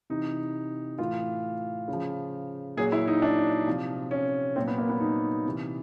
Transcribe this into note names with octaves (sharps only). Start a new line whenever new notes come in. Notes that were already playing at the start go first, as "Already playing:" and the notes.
C3 E3 D#4
A2 E3 F4
C#3
F3
A#2 F#3 G#4
E4
D#4
D4
C3 F3
C#4
A#2 F#3 C4
B3
A#3
B3
D#4
C3 E3